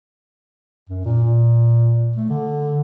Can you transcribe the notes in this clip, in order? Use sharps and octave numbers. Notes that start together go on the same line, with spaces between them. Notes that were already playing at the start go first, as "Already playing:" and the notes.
F#2
A#2
A3
D3